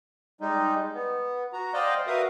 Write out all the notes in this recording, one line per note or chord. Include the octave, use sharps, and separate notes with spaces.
G3 G#3 D#4
B3
F#4 A#5
C5 D5 D#5 F5 G5
F#4 A#4 B4 E5 F5 D#6